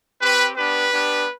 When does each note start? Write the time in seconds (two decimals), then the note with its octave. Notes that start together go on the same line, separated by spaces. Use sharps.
0.22 C4 G4 B4
0.57 B3 D4 G4 B4
0.92 B3 D4 G4